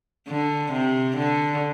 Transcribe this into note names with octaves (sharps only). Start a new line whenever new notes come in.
D3
C3
D3